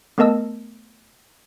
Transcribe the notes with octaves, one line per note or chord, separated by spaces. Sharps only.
A3 B3 A#4 D#5 A5 E6